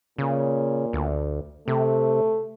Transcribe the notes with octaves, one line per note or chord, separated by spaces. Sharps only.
A#2 C#3
D2
C3 A3